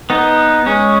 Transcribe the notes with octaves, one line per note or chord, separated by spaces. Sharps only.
B3 D#4
G#3 C#4